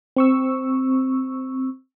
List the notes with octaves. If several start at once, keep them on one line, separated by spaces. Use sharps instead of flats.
C4 C#6 E6